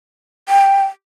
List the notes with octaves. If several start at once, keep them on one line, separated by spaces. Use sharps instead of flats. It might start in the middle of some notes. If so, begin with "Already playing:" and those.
G5